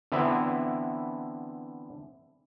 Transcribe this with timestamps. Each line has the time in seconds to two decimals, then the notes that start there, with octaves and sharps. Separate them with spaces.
0.12 D3 E3 B3 C4 E4